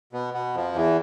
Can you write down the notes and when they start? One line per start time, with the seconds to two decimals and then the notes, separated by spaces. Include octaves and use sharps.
0.13 B2 B3
0.34 B2 B3
0.54 F2 F3
0.75 E2 E3